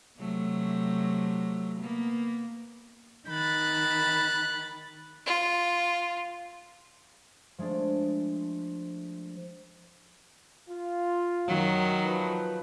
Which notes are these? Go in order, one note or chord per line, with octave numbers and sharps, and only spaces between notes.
C3 F#3 A3
A#3 B3
D#3 B5 F#6 A6
F4
F3 G#3 A3 D4
F4
F#2 D#3 F#3
F3 B4